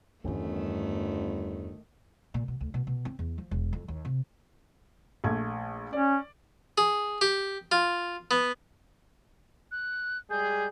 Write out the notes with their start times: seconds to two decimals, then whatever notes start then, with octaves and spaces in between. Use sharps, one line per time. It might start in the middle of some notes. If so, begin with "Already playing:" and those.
0.24 G1 E2 G2 D#3 E3 A3 B3 C#4
2.34 A#2
2.48 B2
2.61 D2
2.74 B2
2.87 B2
3.05 C4
3.19 E2
3.38 F3
3.51 E1
3.73 F2
3.88 D#2
4.05 C3
5.24 A#1 A3 G#6
5.93 C#4 D5
6.78 G#4
7.21 G4
7.72 F4
8.31 B3
9.72 F#6
10.31 G3 G#3 G#4 G6